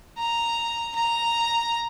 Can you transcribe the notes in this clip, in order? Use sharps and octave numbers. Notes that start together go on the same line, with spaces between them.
A#5
A#5